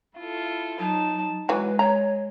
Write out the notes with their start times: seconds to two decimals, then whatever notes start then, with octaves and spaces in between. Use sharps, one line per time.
0.16 E4 F4 A4
0.79 F#3 D#4 A5
1.49 E3 F#3 G#3 B4
1.79 C#5 A#5